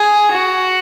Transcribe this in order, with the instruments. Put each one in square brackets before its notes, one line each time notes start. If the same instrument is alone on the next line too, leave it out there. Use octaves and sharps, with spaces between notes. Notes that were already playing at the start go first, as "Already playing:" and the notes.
Already playing: [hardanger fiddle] G#4
F#4